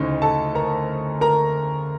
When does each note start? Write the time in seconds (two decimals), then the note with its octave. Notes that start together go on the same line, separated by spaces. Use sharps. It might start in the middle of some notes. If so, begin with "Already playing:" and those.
Already playing: D2 C#3 E3 C#4 D#4 C5 D#5
0.22 A4 A5
0.55 A#4 A#5
1.21 A#4 A#5